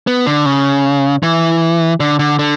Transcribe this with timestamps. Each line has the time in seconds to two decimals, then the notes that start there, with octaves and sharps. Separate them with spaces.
0.07 B3
0.26 D3
0.46 C#3
1.23 E3
2.00 D3
2.19 D3
2.39 D3